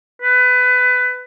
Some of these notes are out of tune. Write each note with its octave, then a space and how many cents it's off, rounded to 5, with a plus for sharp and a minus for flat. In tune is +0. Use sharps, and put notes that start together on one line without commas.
B4 +20